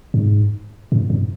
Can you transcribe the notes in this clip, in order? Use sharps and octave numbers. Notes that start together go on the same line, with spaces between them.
G2
G#2
G#2
G2